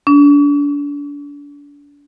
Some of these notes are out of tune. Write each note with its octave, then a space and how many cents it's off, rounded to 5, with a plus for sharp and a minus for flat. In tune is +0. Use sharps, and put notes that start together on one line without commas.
D4 -35